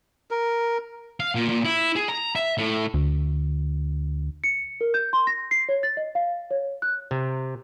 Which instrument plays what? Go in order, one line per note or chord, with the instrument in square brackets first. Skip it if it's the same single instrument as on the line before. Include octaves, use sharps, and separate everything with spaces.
[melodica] A#4
[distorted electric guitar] F5
A#2
A#2
E4
G#4
A#5
E5
A2
[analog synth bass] D2
[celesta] C#7
A#4
G6
C6
A#6
C7
C#5
A6
D#5
F5
C#5
F#6
[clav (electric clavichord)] C3